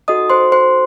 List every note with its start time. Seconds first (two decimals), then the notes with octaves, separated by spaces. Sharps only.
0.08 D#4 F#4 A4 D#5 D#6
0.30 C5 C6
0.52 C5 C6